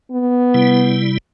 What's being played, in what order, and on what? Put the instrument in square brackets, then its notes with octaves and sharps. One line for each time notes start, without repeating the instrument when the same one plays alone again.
[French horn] B3
[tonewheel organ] C3 G3 E4